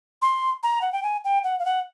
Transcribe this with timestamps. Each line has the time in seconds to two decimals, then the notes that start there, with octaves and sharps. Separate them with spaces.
0.22 C6
0.63 A#5
0.81 F#5
0.93 G5
1.03 G#5
1.25 G5
1.44 F#5
1.59 F5
1.65 F#5